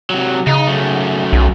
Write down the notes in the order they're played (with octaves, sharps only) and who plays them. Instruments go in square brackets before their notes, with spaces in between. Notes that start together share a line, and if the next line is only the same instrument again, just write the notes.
[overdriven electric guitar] C3 F#3
[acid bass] C#3 [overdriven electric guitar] D#4
[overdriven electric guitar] F#2 A3
[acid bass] B1